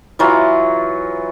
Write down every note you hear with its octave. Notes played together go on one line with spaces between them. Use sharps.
E3 F#3 F4